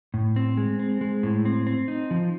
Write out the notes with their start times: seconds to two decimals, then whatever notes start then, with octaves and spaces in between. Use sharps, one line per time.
0.14 A2
0.36 C4
0.57 G#3
0.79 C4
1.01 G#3
1.23 A2
1.45 C4
1.67 C4
1.88 D#4
2.11 F3